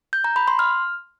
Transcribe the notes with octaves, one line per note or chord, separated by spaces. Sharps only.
G6
A#5
B5
C6
F6